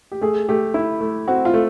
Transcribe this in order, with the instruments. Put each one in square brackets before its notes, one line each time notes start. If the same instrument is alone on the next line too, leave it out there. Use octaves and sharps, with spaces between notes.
[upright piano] G4
[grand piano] A3 [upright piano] G#4
[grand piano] A3 [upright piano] G4
[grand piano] E4
A3
[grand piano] C4 [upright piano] F#4
[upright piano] F4
[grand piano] A3